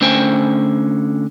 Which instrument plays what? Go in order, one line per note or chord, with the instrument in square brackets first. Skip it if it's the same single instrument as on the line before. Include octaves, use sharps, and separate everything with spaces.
[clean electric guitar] D3 A3 C#4 C5 G5 G#5